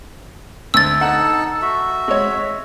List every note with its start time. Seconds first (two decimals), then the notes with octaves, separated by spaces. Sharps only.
0.74 D2 E6 A6
1.01 D#4 A4 F#5 A5
1.62 F#4 E5
2.08 G#3 C#5